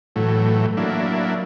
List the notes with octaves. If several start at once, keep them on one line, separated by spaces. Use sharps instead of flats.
A2 E3 F#3 A3
F#3 A#3 D4 E4